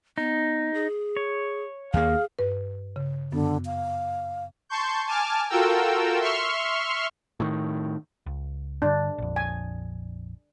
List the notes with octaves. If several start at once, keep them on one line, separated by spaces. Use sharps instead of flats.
B3 D#4
G#4
C#5
D#2 A#3 G#4 F5
G2 B4
C#3
F#2 D3 B3
F5
A5 C6 C#6 G6
G#5 A5 D6 F6
F4 F#4 A4 A#4 G5 E6
E5 C6 C#6 F6
A2 D#3
C#2
G2 D3 D4
A#1 F2
G#5